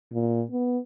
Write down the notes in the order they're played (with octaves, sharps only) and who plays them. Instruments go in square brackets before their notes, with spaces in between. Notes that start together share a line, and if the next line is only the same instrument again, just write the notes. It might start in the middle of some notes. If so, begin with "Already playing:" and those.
[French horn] A#2
B3